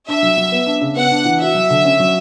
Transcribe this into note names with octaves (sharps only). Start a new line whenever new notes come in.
D4 E5
F#3
F#3
B3
D4
C#3
B3 F#5
D4
E3
F#4 E5
F#3
D3
C#4
F#3